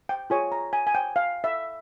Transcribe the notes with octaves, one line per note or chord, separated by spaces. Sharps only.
G5
F4 G#4 C#5 G#5
A#5
G#5
G#5
G5
F5
E5